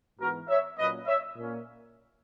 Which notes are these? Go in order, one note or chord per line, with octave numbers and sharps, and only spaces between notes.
G#2 E3 B3 F#4 A#4
C#5 E5
A#2 F#3 A#3 C#4 B4 D#5
C#5 E5
A#2 A#3 C#4